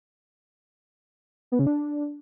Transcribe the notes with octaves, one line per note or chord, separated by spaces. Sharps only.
B3
C#3
D4